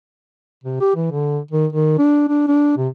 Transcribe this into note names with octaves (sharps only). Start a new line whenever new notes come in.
C3
G4
E3
D3
D#3
D#3
D4
D4
D4
C3